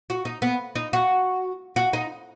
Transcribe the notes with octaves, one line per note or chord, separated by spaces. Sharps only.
F#4
D#4
B3
D#4
F#4
F#4
D#4